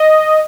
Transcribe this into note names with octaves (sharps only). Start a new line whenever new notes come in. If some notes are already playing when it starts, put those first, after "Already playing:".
Already playing: D#5